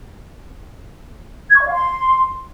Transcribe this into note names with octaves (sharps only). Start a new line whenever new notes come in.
G#6
C#6
D5
F5
C6